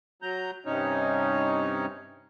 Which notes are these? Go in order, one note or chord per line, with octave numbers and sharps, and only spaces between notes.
F#3 A#5 G6
G2 C3 C#4 D#4 C#5